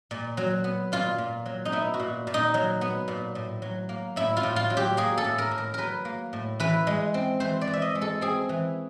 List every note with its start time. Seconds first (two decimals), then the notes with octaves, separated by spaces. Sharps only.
0.11 A#2
0.37 F#3
0.64 B3
0.92 A#2 F4
1.18 A#2
1.46 F#3
1.65 D#4
1.72 B3 E4
1.94 F#4
1.99 A#2
2.27 A#2
2.34 D#4
2.54 F#3
2.81 B3
3.08 A#2
3.35 A2
3.62 F#3
3.89 A#3
4.16 A2 E4
4.37 F4
4.43 A2
4.56 F4
4.70 F#3
4.77 G4
4.97 A#3 G#4
5.18 A4
5.24 A2
5.38 A#4
5.51 A2
5.58 A#4
5.74 F#3 A#4 B4
6.05 A#3
6.33 A2
6.60 E3 B4
6.87 G#3
7.14 C4
7.40 E3 C5
7.61 D5
7.67 E3
7.73 E5
7.82 D#5
7.95 G#3
8.02 A4
8.21 C4 G#4
8.49 E3